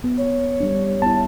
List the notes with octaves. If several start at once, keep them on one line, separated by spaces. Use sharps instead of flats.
B3
C#5
G3 D4
B3 E4 A5